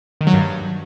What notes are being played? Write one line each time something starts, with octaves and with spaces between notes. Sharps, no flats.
D#3
F#3
G2